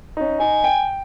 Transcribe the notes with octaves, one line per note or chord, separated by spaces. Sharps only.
C#4 D#4
D#4 G#5
G5